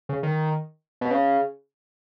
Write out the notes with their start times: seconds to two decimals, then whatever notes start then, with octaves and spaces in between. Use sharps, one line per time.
0.09 C#3
0.23 D#3
1.01 B2
1.11 C#3